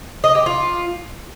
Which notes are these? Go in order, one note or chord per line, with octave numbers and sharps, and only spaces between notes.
D#5
G4
F4